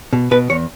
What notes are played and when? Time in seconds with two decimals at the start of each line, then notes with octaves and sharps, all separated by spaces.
0.13 B2
0.31 B2 B4
0.50 E2 C#5